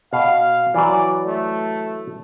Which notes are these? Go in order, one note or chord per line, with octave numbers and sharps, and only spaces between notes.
B2 F5
E3 F#3 D5
A3